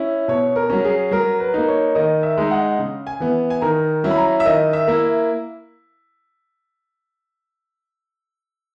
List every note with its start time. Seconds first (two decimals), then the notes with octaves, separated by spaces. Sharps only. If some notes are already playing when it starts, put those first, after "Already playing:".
Already playing: C#4 E4
0.28 B2 C#5
0.56 A#4
0.70 F#3 C#4
0.85 G#4
1.11 F#3 A#4
1.40 B4
1.54 A#3 D#4
1.68 C#5
1.95 D#3 D#5
2.23 E5
2.38 G#3 D#4
2.51 F#5
2.79 C#3
3.07 G#5
3.20 E3 B3
3.50 G#5
3.61 D#3 A#5
4.04 F#3 C#4 E4
4.11 B5
4.17 A#5
4.40 E5
4.46 D#3 D#5
4.73 E5
4.88 A#3 E4